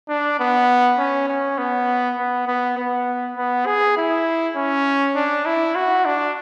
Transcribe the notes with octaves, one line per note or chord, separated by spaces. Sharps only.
D4
B3
C#4
C#4
B3
B3
B3
B3
B3
G#4
E4
C#4
D4
E4
F#4
D4